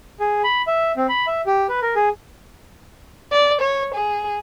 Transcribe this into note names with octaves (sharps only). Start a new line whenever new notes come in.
G#4
B5
E5
C4
B5
E5
G4
B4
A#4
G#4
D5
C#5
G#4